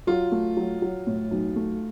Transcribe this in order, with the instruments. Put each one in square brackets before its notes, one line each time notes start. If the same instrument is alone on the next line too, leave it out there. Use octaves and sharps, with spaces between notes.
[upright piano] F#3 [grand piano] F4
[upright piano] A3
F#3
F#3
A2
B1
A3